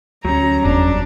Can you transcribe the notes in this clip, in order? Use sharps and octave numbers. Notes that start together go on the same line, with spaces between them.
D2 F#3 G3 C#4 A#5
F#1 E2 D4